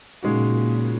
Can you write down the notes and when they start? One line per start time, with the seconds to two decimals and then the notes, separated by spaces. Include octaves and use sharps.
0.23 A#2 C#3 G#3 D#4 F#4